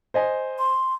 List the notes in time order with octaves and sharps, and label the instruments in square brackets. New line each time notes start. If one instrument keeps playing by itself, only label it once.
[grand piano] C5 D#5 G#5
[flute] C6